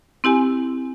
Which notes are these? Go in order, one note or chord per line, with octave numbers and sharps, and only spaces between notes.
C4 E4 G4 G#5